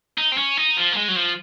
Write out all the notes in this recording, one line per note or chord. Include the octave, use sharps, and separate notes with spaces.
D#4
C4
C#4
D#4
F3
A#3
G#3
F#3
F3